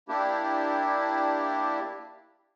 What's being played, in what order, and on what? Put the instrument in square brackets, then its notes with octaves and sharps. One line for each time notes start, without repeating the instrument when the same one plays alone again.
[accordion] A#3 D4 E4 G4